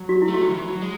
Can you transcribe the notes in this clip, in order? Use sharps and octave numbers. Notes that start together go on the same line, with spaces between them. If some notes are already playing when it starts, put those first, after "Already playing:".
Already playing: F#3
F#4
E4
A3
F#4
F#3
D#3
E3
F#3
G#3